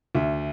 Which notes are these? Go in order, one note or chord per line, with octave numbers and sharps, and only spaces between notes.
D2 E5